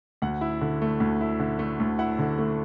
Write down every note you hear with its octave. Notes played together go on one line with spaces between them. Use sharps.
D2 F#5
E4
D3
A3
D2
E4
D3
A3
D2
E4 F#5
D3
A3